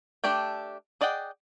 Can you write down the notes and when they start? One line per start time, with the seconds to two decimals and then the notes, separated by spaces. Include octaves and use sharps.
0.24 A3 D4 G4 D5 G5
1.01 G#4 D5 D#5 F#5 G5